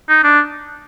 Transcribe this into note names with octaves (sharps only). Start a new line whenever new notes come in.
D#4
D4